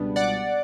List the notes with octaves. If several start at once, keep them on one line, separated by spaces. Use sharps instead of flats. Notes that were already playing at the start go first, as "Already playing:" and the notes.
Already playing: C#2 B2 G3 B3 D4
D5 F#5